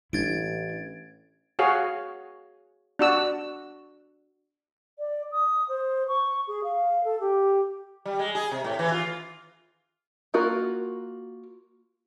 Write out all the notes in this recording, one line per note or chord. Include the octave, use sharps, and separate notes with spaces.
A1 D4 E4 G#6 A6 D7
F#4 G#4 C#5 F5
D4 F#4 E6
D5
D#6
C5
C#6
G#4
F5
A4
G4
G3
G#3
G#4
C3
A2
E3
F4
A#3 F4 F#4 A#4